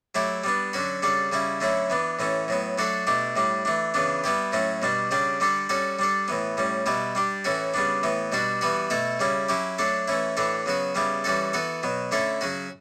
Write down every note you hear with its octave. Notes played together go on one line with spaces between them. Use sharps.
F#3 A3 E4 G4
G3 B3 D4
D3 F#3 C#4 F#4
C#3 G3 D4 A4
C#3 G3 C#4 E4
D3 F#3 A3 C#4 E4
E3 B3 D4
A2 E3 A3 C#4
A2 F#3 B3
F#3 A3 D4 F#4 A4
B2 A3 D4 G4
A2 G3 D4
E3 A3 D4
C#3 E3 B3 D4
G3 B3 E4 G4
A2 F#3 A3 C#4
B2 G3 D4
C#3 G3 D4 G4
D3 G3 D4 A4
G3 C#4 F#4 A4
G3 D4 A4
A2 E3 B3
A2 G3 C#4
B2 G3 B3 E4 G4
G3 D4 G4
A2 E3 A3 C#4 F#4
C#3 G3 B3 D4
A2 E3 B3
B2 G3 D4 F#4
E3 G3 B3 F#4
B2 A3 E4 A4
C#3 G3 C#4 E4
F#3 C#4 E4 G4
F#3 A3 D4 A4
E3 A3 C#4 E4
A2 E3 A3 D4 A4
C#3 F#3 B3 F#4
C#3 G3 B3 E4 G4
E3 G3 C#4 F#4 A4
E3 B3 F#4 A4
B2 F#3 B3
D3 A3 C#4 E4 A4
C#3 F#3 C#4 F#4